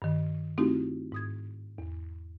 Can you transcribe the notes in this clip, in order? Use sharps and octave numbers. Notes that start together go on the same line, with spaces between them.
G2 D#3
A3 C4 D#4 E4 F#4 G4
G#2 D#6 G#6
E2